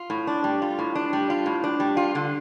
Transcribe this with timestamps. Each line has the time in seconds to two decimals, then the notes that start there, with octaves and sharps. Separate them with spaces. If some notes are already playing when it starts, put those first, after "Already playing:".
Already playing: F4
0.10 A2
0.27 D4
0.44 G3
0.62 F4
0.79 A2
0.95 D4
1.13 G3
1.30 F4
1.46 A2
1.64 D4
1.80 G3
1.97 F4
2.15 D3